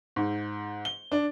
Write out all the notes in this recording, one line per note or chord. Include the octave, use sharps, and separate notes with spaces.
G#2
G7
D4